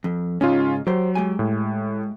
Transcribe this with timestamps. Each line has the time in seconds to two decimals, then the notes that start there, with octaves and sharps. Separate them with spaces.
0.04 F2
0.41 G#2 C#3 C#4 D#4 F4
0.87 F#3 G4 C5
1.15 G#3 G4 G#5
1.39 A2